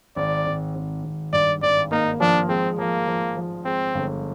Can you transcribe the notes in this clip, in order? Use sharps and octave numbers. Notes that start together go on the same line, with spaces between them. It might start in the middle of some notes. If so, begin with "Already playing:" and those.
G#1 D5
G#1
G#1
G#1
G2 D5
G#1 D5
A#3 D#4
F3 D4
G#3 C4
F3 A#3
F3
F3
G#3 C4
G1